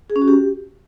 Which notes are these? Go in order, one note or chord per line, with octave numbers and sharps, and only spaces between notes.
G#4
C#4
F#4
G4